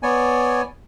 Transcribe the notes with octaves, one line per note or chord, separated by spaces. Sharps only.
B3 C#5 D5 G#5